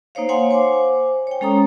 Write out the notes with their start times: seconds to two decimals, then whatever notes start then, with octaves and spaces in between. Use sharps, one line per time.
0.15 A#3 D#4 C5 C#5 F5
0.29 C#5 F5 F#5 G#5 C6
0.51 C5 G#5 D6
1.27 C#5 G5
1.41 G#3 C#4 A4 A#5 D#6